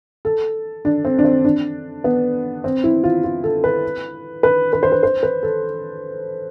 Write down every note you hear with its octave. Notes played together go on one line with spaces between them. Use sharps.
A4
D4
C4
D4
C4
D4
B3
C4
E4
F4
F4
A4
B4
B4
B4
C5
B4
C5
B4
A4